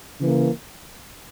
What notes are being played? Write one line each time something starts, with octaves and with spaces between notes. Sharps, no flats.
C#3 E3 A#3